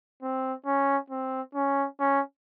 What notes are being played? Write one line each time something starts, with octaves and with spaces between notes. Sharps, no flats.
C4
C#4
C4
C#4
C#4